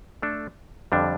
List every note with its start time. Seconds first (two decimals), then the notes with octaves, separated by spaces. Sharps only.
0.22 A3 D4 A4
0.92 F2 D3 G3 D4